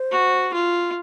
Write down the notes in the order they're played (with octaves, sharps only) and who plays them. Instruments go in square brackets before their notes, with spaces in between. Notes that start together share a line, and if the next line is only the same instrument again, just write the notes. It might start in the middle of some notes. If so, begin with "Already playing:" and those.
Already playing: [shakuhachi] C5
[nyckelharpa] F#4
F4